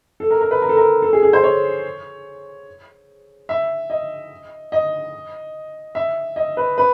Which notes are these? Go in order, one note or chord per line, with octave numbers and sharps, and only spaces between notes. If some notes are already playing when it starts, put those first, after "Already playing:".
A4
A#4
A#4
B4
A#4
A4
A#4
A4
G#4
G#4
C5
C#5
E5
D#5
D#5
E5
D#5
B4
B4